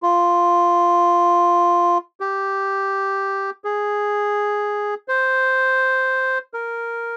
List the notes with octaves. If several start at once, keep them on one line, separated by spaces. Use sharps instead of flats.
F4
G4
G#4
C5
A#4